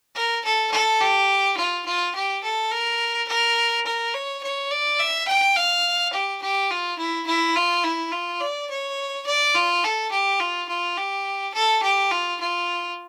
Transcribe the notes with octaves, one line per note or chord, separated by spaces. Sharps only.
A#4
A4
A4
G4
F4
F4
G4
A4
A#4
A#4
A#4
C#5
C#5
D5
E5
G5
F5
G4
G4
F4
E4
E4
F4
E4
F4
D5
C#5
D5
F4
A4
G4
F4
F4
G4
A4
G4
F4
F4